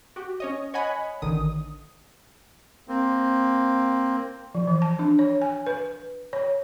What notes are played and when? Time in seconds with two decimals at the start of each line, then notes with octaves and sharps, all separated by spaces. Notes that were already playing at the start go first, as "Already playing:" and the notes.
0.16 F#4 G4
0.40 C#4 C#5 D#5
0.74 C#5 D#5 F#5 G#5 B5
1.22 A1 D3 D#3 D#6
2.88 A#3 C4
4.55 F3
4.67 E3
4.82 A5
4.99 D4
5.19 C#5
5.42 G#5
5.67 B4
6.33 C#5